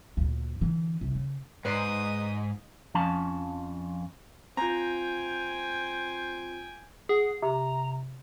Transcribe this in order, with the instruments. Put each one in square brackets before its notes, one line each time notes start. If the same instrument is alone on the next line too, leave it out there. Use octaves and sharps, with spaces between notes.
[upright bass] D2 A#2
D3 E3
C2
C#3
[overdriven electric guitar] G#2 [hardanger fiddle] D#4 D#6 [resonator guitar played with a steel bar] B4 C5 D5
[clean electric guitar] F2 F3 C#4 A5
[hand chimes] C4 F4 [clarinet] C5 [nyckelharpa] G5 G#5 [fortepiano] A#5
[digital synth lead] G#4 [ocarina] F#5
[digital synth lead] C3 [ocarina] A#5